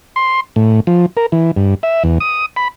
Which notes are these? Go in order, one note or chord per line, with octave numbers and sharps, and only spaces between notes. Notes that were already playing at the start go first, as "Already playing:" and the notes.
C6
A2
F3
A#4
E3
G2
E5
E2
D#6
B5